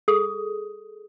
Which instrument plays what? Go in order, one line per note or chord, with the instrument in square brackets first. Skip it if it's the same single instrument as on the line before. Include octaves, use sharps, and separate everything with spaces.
[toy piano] G#4 A4 D#6